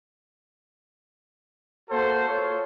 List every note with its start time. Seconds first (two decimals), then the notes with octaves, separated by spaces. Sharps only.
1.90 A#3 F#4 A4 C5
2.28 F4 A4 C#5